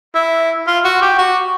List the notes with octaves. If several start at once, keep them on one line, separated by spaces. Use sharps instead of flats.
E4
F4
F#4
G4
F#4